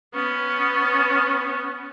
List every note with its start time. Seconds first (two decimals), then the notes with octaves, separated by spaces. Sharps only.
0.14 B3 C#4